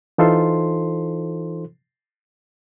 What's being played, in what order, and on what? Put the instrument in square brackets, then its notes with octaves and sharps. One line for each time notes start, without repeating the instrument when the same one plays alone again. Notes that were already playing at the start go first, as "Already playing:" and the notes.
[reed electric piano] E3 D#4 F4 A4 C5 C6